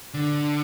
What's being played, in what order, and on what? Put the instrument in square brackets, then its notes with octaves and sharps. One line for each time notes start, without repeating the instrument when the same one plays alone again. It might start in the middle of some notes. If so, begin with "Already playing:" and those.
[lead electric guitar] D3